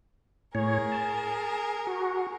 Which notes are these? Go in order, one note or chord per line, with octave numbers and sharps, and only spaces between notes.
A2 G#4 A#4 C#5
A5
F#4